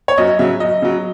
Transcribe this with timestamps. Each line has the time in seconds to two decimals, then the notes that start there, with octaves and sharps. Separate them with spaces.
0.08 C#5
0.18 F#2 D#5
0.39 C#3 F#3 E5
0.60 F#2 D#5
0.82 C#3 F#3